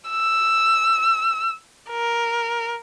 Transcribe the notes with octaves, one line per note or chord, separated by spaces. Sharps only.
E6
A#4